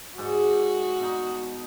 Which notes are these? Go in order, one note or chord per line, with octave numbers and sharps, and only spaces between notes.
G#2 F#4 G#4 D5
B2 D#4